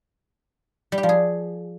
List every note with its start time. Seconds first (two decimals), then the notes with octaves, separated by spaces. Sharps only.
0.92 G3
0.98 G4
1.03 F3
1.09 G#4